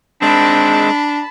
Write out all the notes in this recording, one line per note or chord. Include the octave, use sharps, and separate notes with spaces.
G#3 C4 D4 A5 B5